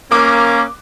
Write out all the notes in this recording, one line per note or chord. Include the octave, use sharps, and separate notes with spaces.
A#3 C#4 D6 D#6 F#6